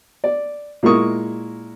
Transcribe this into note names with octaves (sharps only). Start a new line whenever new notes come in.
D5
A#2 G#3 E4 A#4 C#6 D#6